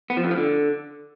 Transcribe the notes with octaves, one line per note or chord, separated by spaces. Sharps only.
B3
F3
F2
F3
D3